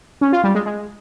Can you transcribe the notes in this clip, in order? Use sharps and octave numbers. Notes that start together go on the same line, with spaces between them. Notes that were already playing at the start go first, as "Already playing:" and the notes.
C#4
F4
G3
G#3
G#3